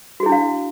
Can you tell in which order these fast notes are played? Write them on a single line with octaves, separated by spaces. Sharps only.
F#4 G#4 E4 D4 F5